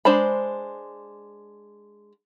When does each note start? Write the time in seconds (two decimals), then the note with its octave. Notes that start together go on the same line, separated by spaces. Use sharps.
0.05 G#3 D4 C5 A#5 B5